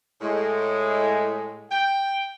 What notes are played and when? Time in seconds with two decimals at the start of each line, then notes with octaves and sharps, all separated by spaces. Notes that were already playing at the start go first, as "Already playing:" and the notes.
0.22 A2 G#3
1.71 G5